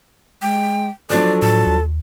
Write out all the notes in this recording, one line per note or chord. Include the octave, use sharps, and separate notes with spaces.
G#3 G5
F3 F#3 D4 A4 D5
A2 A5
D#2